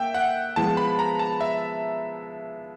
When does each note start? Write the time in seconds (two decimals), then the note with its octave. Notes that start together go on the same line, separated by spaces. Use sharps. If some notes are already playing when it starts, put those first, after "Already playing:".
Already playing: A#3 E5 G5
0.15 F#5
0.56 F3 G#3 B3 A5
0.77 B5
0.99 A#5
1.19 A5
1.41 E5